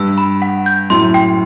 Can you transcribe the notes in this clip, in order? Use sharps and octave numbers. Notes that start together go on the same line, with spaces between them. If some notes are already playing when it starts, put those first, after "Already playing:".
Already playing: G2 E6
B5
F#5
G6
F#2 A2 C6
G5